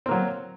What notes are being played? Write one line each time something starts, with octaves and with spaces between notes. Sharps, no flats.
F#3 A#3 C4